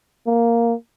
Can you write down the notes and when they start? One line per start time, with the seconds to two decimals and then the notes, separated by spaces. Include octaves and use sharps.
0.27 A#3